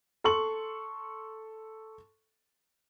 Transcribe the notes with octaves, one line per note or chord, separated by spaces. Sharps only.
A4 C6 C#6 F#7